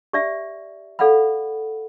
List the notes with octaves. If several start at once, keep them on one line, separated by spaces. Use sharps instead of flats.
G4 D5 E5
A4 D5 F5 F#5 B5